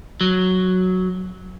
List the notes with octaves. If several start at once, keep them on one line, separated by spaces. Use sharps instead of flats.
F#3